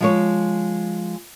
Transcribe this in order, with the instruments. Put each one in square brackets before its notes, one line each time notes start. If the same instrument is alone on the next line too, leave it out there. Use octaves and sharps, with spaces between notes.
[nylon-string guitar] F3 G#3 C#5